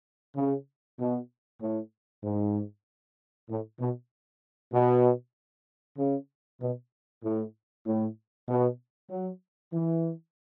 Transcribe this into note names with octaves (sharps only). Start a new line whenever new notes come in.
C#3
B2
A2
G#2
A2
B2
B2
C#3
B2
A2
A2
B2
F#3
E3